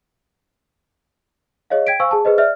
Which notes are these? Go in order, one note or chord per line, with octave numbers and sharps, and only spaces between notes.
G#4 C#5 D#5 F5
G5 G#6 B6 D7
C5 F5 G#5 C#6 E6
G#4 A5
G#4 B4 C5 D#5
D5 E5 F6